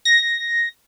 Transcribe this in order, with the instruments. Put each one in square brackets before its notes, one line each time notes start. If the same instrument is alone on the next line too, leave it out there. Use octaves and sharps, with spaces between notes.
[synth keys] A#6